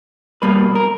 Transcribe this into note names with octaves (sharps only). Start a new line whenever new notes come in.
B2 G3 A#3 B4
A#4